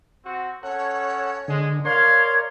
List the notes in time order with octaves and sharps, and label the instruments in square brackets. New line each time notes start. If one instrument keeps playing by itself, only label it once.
[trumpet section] C4 F#4
[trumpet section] C#4 A4 [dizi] C#5 [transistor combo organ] F#5
[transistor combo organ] D3 [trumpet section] G#3
[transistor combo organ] A#4 C#5 D5 [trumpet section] F5 C6 [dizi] G#6